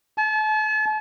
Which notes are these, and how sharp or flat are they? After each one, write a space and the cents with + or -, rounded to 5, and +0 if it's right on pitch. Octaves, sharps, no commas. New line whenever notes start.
A5 -40